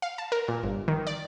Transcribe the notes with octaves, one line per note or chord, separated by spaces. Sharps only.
F5
A5
A#4
A#2
G1
D#3
D5